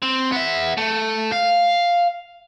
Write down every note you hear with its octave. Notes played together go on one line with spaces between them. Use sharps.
C4
B3 E5
A3
F5